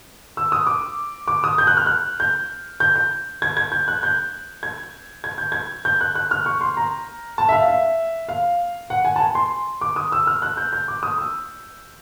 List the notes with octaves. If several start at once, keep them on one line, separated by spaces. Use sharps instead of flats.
E6
D#6
D6
D6
D#6
G6
F#6
F6
F#6
G6
G6
G6
G#6
G#6
G6
F#6
G6
G#6
G#6
G6
G#6
G6
F#6
F#6
F6
C#6
C6
A#5
A5
E5
F5
E5
F5
F#5
G#5
A5
G#5
C6
D6
D#6
E6
F6
F#6
G6
G6
D6
D#6
E6